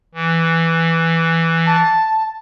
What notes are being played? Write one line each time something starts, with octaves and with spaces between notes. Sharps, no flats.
E3
A5